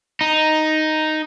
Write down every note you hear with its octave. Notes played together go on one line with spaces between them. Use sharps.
D#4